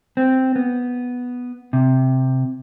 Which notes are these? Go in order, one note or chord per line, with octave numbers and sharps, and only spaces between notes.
C4
B3
C3